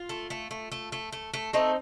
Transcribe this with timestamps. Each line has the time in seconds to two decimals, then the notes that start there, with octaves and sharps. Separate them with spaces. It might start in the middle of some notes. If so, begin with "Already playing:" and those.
Already playing: F4
0.09 A3
0.30 A3
0.51 A3
0.72 A3
0.92 A3
1.12 A3
1.34 A3
1.53 A3 C4 D#4